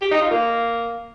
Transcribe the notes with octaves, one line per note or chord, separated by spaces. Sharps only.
G4
D#4
F4
A#3